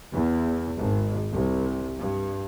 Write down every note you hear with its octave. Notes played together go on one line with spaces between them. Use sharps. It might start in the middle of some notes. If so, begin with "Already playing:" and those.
E2
G#1
C2
G2